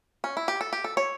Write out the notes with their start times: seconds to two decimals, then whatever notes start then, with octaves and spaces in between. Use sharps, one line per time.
0.24 C#4
0.37 E4
0.48 G4
0.61 A4
0.73 G4
0.84 A4
0.97 C#5